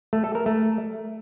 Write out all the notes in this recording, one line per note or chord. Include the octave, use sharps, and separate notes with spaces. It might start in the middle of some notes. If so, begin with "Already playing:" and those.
A3
A4
A#4
A3